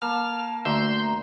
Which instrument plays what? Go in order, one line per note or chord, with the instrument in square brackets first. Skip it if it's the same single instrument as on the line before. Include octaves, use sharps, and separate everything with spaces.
[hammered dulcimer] A#3 [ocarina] A5 [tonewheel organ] F6
[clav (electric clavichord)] D2 E5 [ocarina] A#5 [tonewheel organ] C6 G6